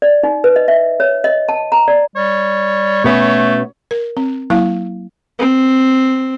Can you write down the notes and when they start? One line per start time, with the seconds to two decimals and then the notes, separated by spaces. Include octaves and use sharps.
0.02 D5
0.23 D#4
0.44 B4
0.56 D#5
0.68 E5
1.00 C#5
1.24 D#5
1.49 A5
1.72 A#5
1.88 D5
2.16 G3 C#5
3.04 B2 A3 B3 C#4
3.91 A#4
4.17 C4
4.50 F#3 A#3 E4 F5
5.39 C4